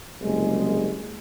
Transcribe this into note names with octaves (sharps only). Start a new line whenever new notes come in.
F#1 C2 G#3